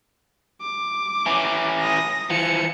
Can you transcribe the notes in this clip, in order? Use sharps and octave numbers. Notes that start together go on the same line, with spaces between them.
D6
E3 C#4
D#6 A#6
E3 F3 C#7